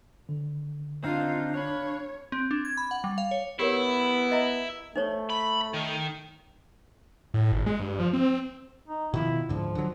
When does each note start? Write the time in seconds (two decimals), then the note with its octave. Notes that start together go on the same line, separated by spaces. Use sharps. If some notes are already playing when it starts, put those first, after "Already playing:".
0.29 D3
1.04 C4 D4 D#4 F4 F5
1.54 C#5 F5 B5
2.32 C4
2.51 D4
2.65 G#6
2.77 B5
2.91 F#5
3.04 G3
3.18 F5
3.31 C#5
3.59 B3 E4 G4 A#4 C#5
4.31 D#5 E5 A#5
4.96 A3 D#4 C5 C#5
5.30 B5
5.74 D#3
7.34 A2
7.52 G#1
7.66 G#3
7.80 G2
8.00 F3
8.13 C4
8.88 D#4
9.14 B2 D#3 F3 E4
9.49 C#2 G#2 D3 F3
9.75 D3 F#3